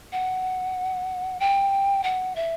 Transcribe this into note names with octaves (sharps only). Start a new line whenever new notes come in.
F#5
G5
F#5
E5